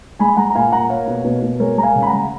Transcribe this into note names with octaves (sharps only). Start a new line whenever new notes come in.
G#3 G#5 B5
G#3 F#5 A#5
A#5
A#2 F5 G#5
A#2 F#5 A#5
A#3 C#5 F5
B2
B2
B2
G#3 A#4 C#5
G#3 A#5
F5 G#5
C#3
B5
F#5 A#5
G#3